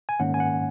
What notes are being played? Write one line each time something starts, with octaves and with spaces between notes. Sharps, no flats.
G#5
G#2 D#3 A#3 C#4 F#5
G#5
F#5